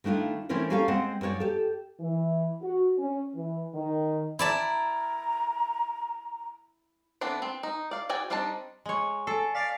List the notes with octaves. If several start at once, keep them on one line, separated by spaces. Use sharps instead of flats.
D#3 A3 D4 E4 F4
E3 A3 C4 C#4 E4 A#4
A#3 C#4 G4 A4 A#4 F5
G#3 C4 C5 D#5 F#5
F#2 A#3 A#4 C#5 D5
G4 A4
E3
F#4
C#4
E3
D#3
E4 D5 A5 A#5
E3 B3 C4 D4 A4
C4
D#4
D5 F5
F#4 G#4 D5 G5 G#5
G3 C4 D4 D#4 A5
G#3 C#5
A4 G#5 C7
D5 F5 B6 C7 D7